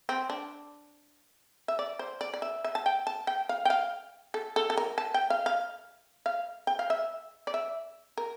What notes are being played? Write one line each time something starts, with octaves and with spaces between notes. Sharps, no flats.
C4
D4
E5
D5
C5
D5
D5
E5
E5
A5
G5
A5
G5
F5
G5
F5
A4
A4
A4
A#4
A5
G5
F5
F5
F5
G5
F5
E5
D5
E5
A#4